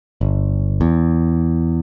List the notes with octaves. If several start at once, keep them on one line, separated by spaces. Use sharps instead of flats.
G1
E2